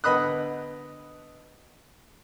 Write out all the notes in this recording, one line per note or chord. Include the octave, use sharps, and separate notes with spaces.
D3 B3 D#5 B5 D#6 F#6